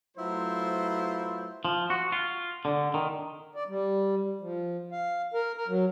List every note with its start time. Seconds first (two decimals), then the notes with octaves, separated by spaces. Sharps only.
0.17 F#3 A3 E4 F4 B4 C5
1.65 F3
1.90 F#4
2.12 F4
2.65 D3
2.94 D#3
3.55 D5
3.68 G3
4.41 F3
4.92 F5
5.34 A#4
5.56 A#4
5.68 F#3